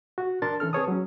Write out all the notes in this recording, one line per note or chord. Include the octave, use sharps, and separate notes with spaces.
F#4
D4 A#4 A5 C6 A6
E3 C#4 A4 F6
C4 G#4 B4 C#5 A5 D#6
F#3 C#4